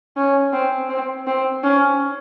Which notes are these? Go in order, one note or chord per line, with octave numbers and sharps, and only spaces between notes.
C#4
C4
C4
C4
C#4